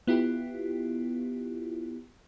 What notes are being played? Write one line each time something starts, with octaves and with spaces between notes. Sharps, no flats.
B3 E4 F4 G4